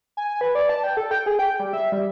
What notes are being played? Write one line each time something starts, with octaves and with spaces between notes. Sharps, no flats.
G#5
B4
D5
A5
G5
A4
G5
G#4
G5
G3
E5
G3